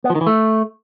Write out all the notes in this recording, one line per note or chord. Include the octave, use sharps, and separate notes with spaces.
B3
F3
D#3
E3
A3